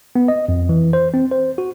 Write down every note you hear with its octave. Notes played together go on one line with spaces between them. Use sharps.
B3
D#5
F2
E3
C5
C4
C5
F#4